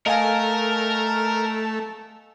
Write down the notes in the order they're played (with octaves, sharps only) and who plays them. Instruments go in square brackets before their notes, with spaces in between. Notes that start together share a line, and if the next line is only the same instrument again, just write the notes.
[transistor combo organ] A3 [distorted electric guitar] A#4 [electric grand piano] D#5 F5 G#5